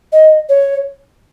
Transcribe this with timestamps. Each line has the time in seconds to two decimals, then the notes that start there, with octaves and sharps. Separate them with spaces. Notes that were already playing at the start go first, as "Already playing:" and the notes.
0.12 D#5
0.49 C#5